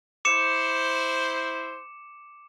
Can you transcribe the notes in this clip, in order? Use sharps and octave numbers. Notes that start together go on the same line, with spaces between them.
E4 C5 D6 C#7 E7